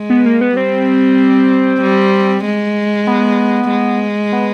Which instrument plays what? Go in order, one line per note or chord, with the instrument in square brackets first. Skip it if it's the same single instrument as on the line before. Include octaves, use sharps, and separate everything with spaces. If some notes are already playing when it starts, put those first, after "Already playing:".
Already playing: [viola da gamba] G#3
[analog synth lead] B3
A#3
B3
[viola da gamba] G3 [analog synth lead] C4
[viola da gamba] G3
G#3
[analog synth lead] B3
[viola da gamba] G#3
[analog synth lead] B3